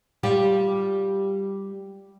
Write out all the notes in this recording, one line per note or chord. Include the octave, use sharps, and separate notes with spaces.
G3 F4 G4